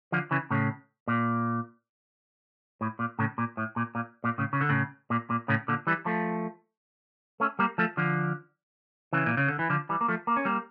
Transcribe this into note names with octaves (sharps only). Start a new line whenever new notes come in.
D3 F3
C#3 E3
A2 C#3
A#2
A2
A#2
A2 C#3
A#2
A2
A#2
A#2
A#2
A2 C#3
C#3
D3
A2 C#3
A#2
A#2
A2 C#3
A#2 D3
E3 G3
F3 A3
A3 C#4
G3 A#3
F3 A3
D3 F3
C#3 E3
A#2
C#3
D3
E3
D3 F3
E3 G3
A#3
F3 A3
A#3
C#4
G3 A#3